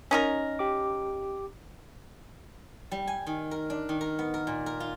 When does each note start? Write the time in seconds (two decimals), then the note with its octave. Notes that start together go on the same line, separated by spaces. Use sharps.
0.11 C#4 D#4 A#4
0.59 G4 D6
2.91 G3
3.07 G#5
3.27 D#3
3.51 A#4
3.70 D4
3.89 D#3
4.01 A#4
4.19 B3
4.34 A#4
4.47 A#2
4.66 A#4
4.80 F4